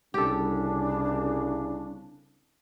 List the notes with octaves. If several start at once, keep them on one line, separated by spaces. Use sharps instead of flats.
C2 C#3 D4 G4 A4